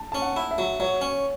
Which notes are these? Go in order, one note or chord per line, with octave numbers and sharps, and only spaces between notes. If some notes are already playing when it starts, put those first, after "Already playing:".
Already playing: A5
C#4 A5
F#5
E4
E5
F#3
F#3 C#5
C#4